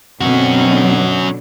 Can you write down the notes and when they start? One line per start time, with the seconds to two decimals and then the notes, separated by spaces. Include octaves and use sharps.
0.21 B2 D3 F#3 C4 C#4 F#4